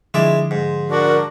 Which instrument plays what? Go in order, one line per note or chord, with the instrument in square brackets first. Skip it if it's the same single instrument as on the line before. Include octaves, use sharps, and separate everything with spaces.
[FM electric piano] D3 F3 C6 [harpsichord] G#3 E4 D5
[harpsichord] G#2
[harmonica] D4 F#4 [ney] A#4